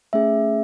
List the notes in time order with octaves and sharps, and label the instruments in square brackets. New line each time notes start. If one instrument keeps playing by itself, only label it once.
[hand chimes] A3 C#4 G#4 E5